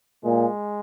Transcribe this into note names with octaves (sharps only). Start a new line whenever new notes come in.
A#2 G#3